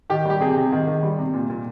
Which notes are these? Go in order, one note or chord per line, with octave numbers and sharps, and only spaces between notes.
D#3 G4
G3 G4
C3 G#4
C3
D#3
D#3
G3
C3
A#2
A#2